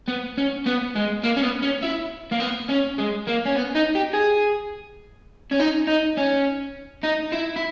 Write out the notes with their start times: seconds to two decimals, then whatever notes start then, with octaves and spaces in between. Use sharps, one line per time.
0.08 B3
0.38 C#4
0.66 B3
0.96 G#3
1.24 A#3
1.37 C#4
1.43 B3
1.63 C#4
1.83 E4
2.31 A#3
2.40 B3
2.69 C#4
2.98 G#3
3.28 A#3
3.46 C#4
3.56 B3
3.75 D#4
3.95 G4
4.14 G#4
5.51 C#4
5.60 D#4
5.87 D#4
6.18 C#4
7.04 D#4
7.32 E4
7.56 E4